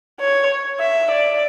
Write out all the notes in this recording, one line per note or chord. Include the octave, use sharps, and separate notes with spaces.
C#5
E5
D5